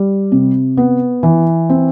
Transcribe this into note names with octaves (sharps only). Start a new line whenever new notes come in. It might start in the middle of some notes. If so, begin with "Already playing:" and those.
Already playing: G3
C3
B3
E3
C4